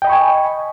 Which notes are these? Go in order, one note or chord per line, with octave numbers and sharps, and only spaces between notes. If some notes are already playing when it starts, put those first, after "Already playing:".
D#5 G5 G#5 B5 C#6